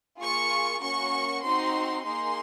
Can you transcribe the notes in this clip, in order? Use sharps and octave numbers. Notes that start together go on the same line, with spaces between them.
A#3 F4 G#4 C#6
A#3 C#4 F#4 C#6
C4 D#4 F#4 C6
A#3 D#4 G#4 C6